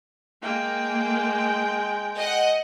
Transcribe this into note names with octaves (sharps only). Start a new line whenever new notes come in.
G#3 A#3 G5
D#5 F#5